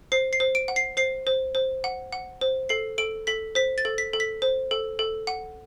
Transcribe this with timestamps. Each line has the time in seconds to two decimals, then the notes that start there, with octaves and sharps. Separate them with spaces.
0.12 C5 C7
0.33 C7
0.40 C5
0.55 D7
0.68 F#5
0.76 C7
0.97 C5 C7
1.27 C5
1.55 C5
1.84 F#5
2.12 F#5
2.41 C5
2.69 A4 C7
2.98 A4 D7
3.27 A4 B6
3.55 C5 B6
3.78 A6
3.85 A4
3.98 B6
4.13 A4
4.20 B6
4.42 C5
4.71 A4
4.99 A4
5.27 F#5